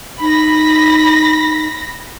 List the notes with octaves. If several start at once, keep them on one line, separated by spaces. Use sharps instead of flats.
D#4 B5 A#6 B6